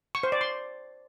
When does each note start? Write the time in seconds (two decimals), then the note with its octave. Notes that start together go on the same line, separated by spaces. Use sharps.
0.15 C#6
0.23 C5
0.32 D5
0.41 C6